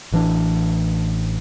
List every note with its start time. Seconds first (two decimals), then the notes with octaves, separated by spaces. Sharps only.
0.12 A1 E3 D4